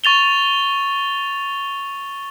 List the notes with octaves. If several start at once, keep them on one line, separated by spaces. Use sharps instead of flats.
C#6 A6 F7 G7